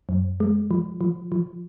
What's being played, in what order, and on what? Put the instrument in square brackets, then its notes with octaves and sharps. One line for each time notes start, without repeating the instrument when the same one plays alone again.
[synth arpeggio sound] F#2
G#3
F3
F3
F3